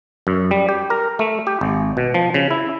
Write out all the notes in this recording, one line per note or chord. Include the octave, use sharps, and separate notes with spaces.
F#2
G3
G4
A#4
A3
G4
G#1
B2
F3
C#3
E4